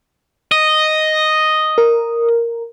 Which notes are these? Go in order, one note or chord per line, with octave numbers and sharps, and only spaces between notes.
D#5
A#4